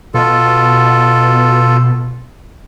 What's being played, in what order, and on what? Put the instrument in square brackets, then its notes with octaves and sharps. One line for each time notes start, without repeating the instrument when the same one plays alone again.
[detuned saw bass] B2 [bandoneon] F4 A4